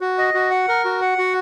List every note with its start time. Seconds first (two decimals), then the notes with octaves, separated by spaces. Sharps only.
0.01 F#4
0.18 D#5
0.34 F#4
0.51 F#5
0.68 A#4
0.85 F#4
1.01 F#5
1.18 F#4